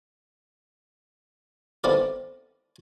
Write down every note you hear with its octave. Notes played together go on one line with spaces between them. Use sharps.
B3 C4 D#4 E4 A4 D5